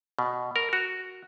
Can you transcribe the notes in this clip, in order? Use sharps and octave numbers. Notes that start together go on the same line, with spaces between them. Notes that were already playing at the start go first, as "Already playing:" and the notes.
B2
A#4
F#4